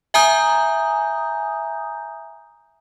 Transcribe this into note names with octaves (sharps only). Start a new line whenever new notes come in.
E5 G#5 A#5 D#6 G6